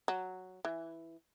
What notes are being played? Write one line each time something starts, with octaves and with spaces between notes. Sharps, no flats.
F#3
E3